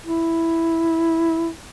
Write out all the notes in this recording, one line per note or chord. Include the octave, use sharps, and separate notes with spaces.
E4